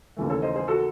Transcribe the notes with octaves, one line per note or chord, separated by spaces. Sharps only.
D#2 C#3 E3 A3
A4 C#5
C5 D#5
G#4 C5
F#4 A4